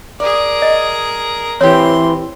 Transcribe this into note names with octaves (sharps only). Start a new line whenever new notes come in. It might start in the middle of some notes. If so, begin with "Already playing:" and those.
G#4 A#4 D5
D#5
E3 C4 G4 C#5 C6